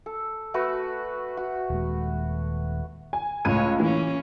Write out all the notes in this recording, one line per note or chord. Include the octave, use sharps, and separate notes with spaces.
A4
A3 F#4 B4
F#4
D#1 G#3
G#5
C#2 A2 C#5 G#6 D#7
E3 A#3 C#4